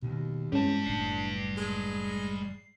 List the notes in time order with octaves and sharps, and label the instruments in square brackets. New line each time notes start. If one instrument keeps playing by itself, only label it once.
[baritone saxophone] D#2 [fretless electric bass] B2 D#3
[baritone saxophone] E2 [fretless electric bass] G2 C4 [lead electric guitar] G3 A5 [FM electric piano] G#3 C#4
[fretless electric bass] F#1 A2 [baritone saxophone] D4 [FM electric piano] C7
[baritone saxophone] G#3